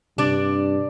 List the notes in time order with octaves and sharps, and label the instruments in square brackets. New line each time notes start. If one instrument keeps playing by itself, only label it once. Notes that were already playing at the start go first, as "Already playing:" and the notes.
[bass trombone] G2 [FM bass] C3 [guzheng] D4 D5